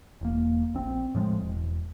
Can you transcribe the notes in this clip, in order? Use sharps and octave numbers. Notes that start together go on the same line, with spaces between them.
E1 A#3
A#1 C4
A2 F3 G#3
E1